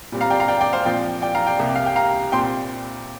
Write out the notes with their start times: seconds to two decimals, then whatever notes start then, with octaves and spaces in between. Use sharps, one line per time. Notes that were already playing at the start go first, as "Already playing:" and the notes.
0.12 A#2 G3 C4
0.21 F5 A#5
0.30 D5 G5
0.40 F5 A#5
0.48 D5 G5
0.61 D5 G5
0.73 C5 F5
0.85 A#2 F3 C4 D5 G5
1.22 D5 G5
1.35 F5 A#5
1.46 D5 G5
1.59 C2 C3 A#3
1.76 F5
1.86 G5
1.96 F5 A#5
2.32 A#2 G3 C4 G5 C6